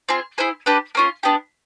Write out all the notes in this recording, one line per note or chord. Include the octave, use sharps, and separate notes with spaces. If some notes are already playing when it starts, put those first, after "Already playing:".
C4 F4 G#4
E4 G#4 C5
D4 G4 B4
A#3 C#4 F4
B3 D4 G4